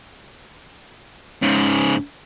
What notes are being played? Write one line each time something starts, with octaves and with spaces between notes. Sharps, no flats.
G#2 C#3